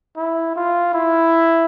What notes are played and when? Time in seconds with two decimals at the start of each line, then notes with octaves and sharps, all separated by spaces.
0.17 E4
0.56 F4
0.94 E4